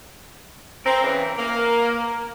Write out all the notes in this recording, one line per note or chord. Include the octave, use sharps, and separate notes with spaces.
C4 A#4
C#3 E3
A#3